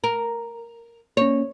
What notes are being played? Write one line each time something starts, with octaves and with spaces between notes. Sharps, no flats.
A#4
A#3 C#4 C#5